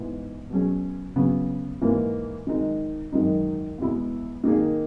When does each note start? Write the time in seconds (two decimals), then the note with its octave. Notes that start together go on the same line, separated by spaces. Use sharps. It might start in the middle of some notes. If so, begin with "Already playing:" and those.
Already playing: G#2 E3 B3
0.50 B2 F#3 C#4 G#4
1.16 C#3 F#3 B3
1.81 G#2 E3 A#3
2.47 D#3 G#3 D#4
3.12 F#2 D#3 G#3 D#4
3.78 E2 B2 G#3 B3 E4
4.44 D#3 A#3 D#4 G#4